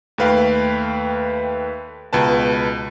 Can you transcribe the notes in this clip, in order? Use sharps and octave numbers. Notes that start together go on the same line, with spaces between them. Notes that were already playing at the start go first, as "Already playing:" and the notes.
D#2 A3 B4 F5 G5
C#2 B2 B4 A5